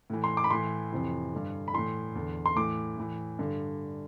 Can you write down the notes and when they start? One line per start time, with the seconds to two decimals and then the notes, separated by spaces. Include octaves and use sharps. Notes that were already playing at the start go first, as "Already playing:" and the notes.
0.10 A2 E3
0.24 C6
0.37 D6
0.44 B5
0.50 A2 E3 C6
0.92 F2 C3 E3
1.33 G2 D3
1.68 B5
1.74 A2 E3 C6
2.15 E2 D3
2.46 C6
2.56 A2 E3 D6
2.97 A2 E3
3.39 G2 D3